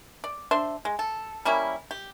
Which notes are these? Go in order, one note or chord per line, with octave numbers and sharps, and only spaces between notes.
D5
D4 C5 E5 C6
G#3
A4
G3 A#3 C#4 E4
G4